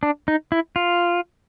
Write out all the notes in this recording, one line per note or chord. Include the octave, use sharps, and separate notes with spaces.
D4
D#4
E4
F4